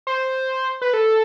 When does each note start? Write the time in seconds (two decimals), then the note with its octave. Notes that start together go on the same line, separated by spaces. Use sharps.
0.07 C5
0.82 B4
0.93 A4